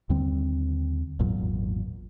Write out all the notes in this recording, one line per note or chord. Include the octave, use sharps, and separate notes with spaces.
D#2 D3 G3 C4
G#1 E2 A#2 F#3